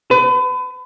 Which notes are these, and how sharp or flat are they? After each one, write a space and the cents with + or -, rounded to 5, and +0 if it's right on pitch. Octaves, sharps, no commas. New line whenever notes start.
B4 +35